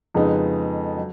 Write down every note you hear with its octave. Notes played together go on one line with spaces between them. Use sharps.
F2 C#3 G#3 B3 D#4
F#3